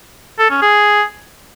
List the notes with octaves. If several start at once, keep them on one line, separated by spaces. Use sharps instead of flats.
A4
C#4
G#4